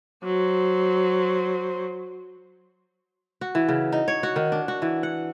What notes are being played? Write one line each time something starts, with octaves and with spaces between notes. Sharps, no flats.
F#3 C5
F#4
E3
C#3
D#4
C#5
F#4
D#3
D4
F#4
E3
F#5